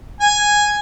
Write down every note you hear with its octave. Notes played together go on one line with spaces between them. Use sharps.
G#5